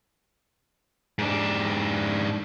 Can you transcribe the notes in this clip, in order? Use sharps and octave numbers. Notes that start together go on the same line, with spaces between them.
G#2 D4